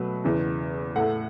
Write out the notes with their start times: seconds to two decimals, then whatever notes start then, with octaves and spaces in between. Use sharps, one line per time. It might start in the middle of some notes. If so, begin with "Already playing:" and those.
Already playing: B2 F#3 A3 B4
0.24 E2 C#3 E3
0.96 A2 A3 F#5